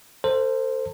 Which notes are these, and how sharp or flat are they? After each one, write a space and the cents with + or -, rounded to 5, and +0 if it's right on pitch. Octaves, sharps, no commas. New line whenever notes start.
A4 +35 C5 +0